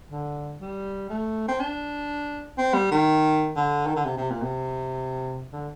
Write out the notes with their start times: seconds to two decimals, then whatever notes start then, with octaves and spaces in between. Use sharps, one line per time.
0.12 D3
0.61 G3
1.10 A3
1.48 C4
1.60 D4
2.58 C4
2.74 G3
2.91 D#3
3.56 D3
3.87 D#3
3.96 D3
4.05 C3
4.18 C3
4.30 A#2
4.42 C3
5.53 D3